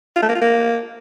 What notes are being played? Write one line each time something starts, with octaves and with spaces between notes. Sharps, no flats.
F4
A3
A#3
F4
A#3